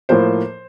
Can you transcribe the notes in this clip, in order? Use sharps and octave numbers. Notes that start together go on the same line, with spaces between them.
A2 F3 A#3 C5